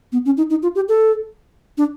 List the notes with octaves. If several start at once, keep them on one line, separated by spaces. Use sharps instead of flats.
B3
C#4
D#4
D#4
F4
G4
A4
D4